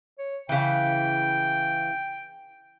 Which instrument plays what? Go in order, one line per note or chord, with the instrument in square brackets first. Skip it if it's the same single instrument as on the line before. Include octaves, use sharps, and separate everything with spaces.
[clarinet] C#5
[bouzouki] C#3 E3 [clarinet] G5